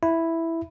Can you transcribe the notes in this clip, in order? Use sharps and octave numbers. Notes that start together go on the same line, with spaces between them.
E4